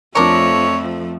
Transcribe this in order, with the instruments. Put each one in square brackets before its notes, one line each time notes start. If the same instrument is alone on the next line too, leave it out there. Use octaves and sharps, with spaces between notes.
[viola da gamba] F2 F3 A3 [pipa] D4 A#4 [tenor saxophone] C#5